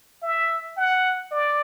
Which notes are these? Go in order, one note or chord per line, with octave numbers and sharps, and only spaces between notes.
E5
F#5
D5